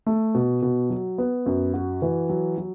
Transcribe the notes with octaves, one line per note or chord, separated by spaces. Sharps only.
A3
B2
B2
F#3
B3
F#2
F#4
E3
F#3
F#3